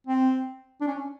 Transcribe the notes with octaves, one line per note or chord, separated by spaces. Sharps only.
C4
D4
C#4